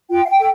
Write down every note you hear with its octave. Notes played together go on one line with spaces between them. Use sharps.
F4 G5
F5
G5
A4